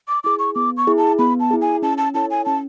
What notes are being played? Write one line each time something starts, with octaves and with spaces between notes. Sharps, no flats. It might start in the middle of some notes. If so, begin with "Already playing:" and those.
D6
E4 G#4 D6
C#6
B3 D6
C#6
E4 G#4
A5
B3 B5
A5
E4 G#4
G#5
C#4 A5
A5
E4 A4 C#5 A5
G#5
C#4 A5